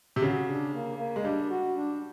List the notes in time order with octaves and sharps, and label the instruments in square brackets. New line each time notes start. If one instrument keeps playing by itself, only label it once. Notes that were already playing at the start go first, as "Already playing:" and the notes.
[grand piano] C3
[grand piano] C#3 [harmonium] F#4
[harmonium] D4
A#3
A#3
[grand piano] G#3
[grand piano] G3 [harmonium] D4
[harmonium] F#4
D4